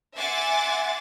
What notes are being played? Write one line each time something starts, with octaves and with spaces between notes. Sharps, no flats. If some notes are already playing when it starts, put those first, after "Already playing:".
E5 F#5 G#5 C6 D6 A6